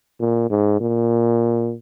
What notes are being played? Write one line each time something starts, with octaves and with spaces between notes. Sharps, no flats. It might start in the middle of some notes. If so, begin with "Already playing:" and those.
A#2
G#2
A#2